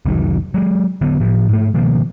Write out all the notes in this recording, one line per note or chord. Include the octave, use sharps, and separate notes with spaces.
F1 C2 D#3 F#3
F#3 G#3
D3 F#3 B3
A2 F3
G#2 A3
B2 D#3 F3 A#3